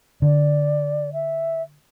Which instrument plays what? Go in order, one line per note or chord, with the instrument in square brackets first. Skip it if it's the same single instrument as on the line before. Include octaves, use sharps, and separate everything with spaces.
[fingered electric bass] D3 [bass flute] D5
[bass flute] E5